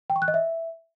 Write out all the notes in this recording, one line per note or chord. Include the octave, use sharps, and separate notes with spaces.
G5
C#6
F#6
D#5
E5